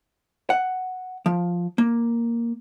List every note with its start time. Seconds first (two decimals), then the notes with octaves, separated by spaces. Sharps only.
0.50 F#5
1.26 F3
1.78 A#3